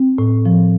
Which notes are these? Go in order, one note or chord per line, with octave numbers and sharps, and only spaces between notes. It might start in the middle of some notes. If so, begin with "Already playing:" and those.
Already playing: C4
A2
F3